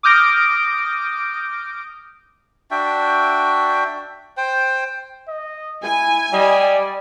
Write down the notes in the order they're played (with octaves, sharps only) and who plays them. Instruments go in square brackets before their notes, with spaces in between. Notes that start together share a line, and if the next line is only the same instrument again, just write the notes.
[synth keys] D6 D#6 F6 G6 A#6 D7
[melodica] D4 F#4 E5 G5
C5 G5
[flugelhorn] D#5
[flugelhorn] E4 [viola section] G#5
[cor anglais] G3 [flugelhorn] D#5
[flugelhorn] D5